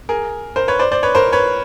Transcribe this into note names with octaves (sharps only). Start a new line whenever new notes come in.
G#4 A#4
A#4 C5
B4 C#5
C5 D5
C5 D5
B4 C#5
A#4 C5
B4 C#5